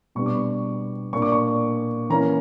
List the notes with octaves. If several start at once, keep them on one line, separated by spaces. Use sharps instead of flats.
B2 G3 B3 D4 C#6
D6
C#6
A#2 A#3 D4 C#6
D6
C#6
E3 A#3 C#4 A#5